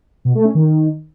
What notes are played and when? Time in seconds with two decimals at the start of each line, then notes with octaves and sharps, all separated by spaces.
0.25 B2
0.35 A3
0.45 C#4
0.55 D#3